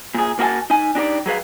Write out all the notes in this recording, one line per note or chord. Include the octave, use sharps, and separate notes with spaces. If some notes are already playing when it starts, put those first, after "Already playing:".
A#2 G#4
A#3 F#4 A#4 E5 G#5 A5
D#4 G#5
D4 D#4 G4 D5
F#3 G#4 B4 F5